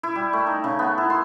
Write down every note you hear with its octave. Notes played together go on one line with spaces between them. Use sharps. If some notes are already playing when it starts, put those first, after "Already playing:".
E4
G3
A3
D#4
C#3
B3
E4
C6